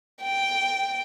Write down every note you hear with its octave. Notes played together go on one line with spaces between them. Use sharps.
G5